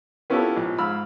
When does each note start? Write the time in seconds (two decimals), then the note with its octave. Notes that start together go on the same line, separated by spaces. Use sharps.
0.30 B3 C#4 E4 F4 G4 A4
0.56 A#1
0.78 G#2 F5 B5 E6 F6